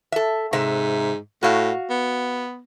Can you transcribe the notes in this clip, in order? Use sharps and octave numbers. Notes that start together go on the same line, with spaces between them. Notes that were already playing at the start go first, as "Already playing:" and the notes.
A4 E5
G#2 C3 E5
A2 F#4 F5
B3